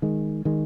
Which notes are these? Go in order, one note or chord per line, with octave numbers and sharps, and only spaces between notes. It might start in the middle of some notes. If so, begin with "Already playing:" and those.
D#3 G#3
D#3 G#3